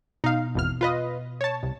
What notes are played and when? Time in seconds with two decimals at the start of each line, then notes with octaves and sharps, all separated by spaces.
0.24 B2 D#4 F5
0.55 G#1 E2 F6
0.81 F4 B4 D#5
1.41 C#5 A5
1.63 C2